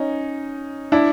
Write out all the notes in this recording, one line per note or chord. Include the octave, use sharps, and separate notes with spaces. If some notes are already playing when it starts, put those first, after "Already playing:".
Already playing: C#4 D#4
D4 E4